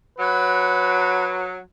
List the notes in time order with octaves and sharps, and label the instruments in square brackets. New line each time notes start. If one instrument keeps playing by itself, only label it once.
[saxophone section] F#3 [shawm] B4